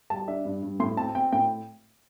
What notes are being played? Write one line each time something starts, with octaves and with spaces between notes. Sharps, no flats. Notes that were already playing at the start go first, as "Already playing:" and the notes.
G3 A5
D4 E5
G2
G2
A2 C6
C4 A5
C4 G5
A2 G5